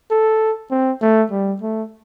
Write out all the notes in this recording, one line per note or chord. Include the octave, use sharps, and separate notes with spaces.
A4
C4
A3
G3
A3